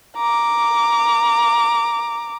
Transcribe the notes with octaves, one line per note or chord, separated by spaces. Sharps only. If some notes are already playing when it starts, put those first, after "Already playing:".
A#5 D6